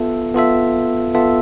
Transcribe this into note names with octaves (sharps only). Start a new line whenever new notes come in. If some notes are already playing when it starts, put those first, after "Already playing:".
Already playing: B3 F4 A4 E5
B3 F4 A4 E5
B3 F4 A4 E5